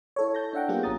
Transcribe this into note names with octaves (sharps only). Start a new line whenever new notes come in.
E4 A4 C#5
A5 G6 A#6
D4 E5 F#5 G5
F#3 A#3 B3 F4 G4 G#4
G#1 C#4 A#5 D#6 A6